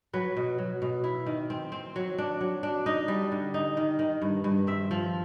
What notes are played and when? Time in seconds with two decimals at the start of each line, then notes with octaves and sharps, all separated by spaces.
0.13 F#3 B4
0.36 B2
0.58 F#3
0.82 B2
1.04 E4
1.26 D#3
1.50 C4
1.72 C4
1.96 F#3
2.18 D4
2.41 F#3
2.63 D4
2.86 D#4 D#5
3.08 G3
3.32 D3
3.54 D#4
3.77 D#3
3.99 D#3
4.22 G2
4.44 G2
4.67 C4 E5
4.91 F3